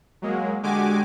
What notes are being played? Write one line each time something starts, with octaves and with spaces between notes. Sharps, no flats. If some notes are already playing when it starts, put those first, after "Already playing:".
F#3 G#3 A#3
D3 G#3 F#4 G4 G#5 D6